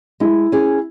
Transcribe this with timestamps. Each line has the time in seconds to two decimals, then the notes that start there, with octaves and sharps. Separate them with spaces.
0.20 G#3 E4
0.52 C#4 G#4